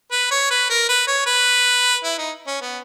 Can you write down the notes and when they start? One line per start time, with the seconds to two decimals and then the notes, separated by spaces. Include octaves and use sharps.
0.11 B4
0.31 C#5
0.50 B4
0.70 A#4
0.89 B4
1.07 C#5
1.27 B4
2.04 E4
2.18 D#4
2.47 C#4
2.61 B3